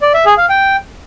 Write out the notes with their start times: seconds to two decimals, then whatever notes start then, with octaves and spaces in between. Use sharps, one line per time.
0.02 D5
0.14 E5
0.26 G#4
0.38 F5
0.50 G5